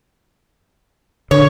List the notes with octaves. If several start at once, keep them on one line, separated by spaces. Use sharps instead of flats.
D3 C#5